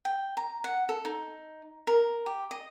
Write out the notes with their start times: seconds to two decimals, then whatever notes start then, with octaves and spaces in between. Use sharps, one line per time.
0.05 G5
0.37 A#5
0.64 F#5
0.89 A4
1.05 D#4
1.87 A#4
2.26 G4
2.51 D#5